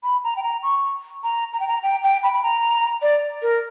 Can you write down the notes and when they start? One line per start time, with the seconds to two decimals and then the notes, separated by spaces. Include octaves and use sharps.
0.03 B5
0.24 A#5
0.36 G5
0.43 A#5
0.63 C#6
1.24 A#5
1.53 A#5
1.60 G5
1.68 A#5
1.82 G5
2.04 G5
2.23 B5
2.34 B5
2.43 A#5
3.02 D5
3.42 A#4